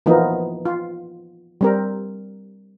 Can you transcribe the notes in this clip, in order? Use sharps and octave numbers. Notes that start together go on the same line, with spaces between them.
E3 F3 A#3 B3 D#4
F4
G3 C4 A#4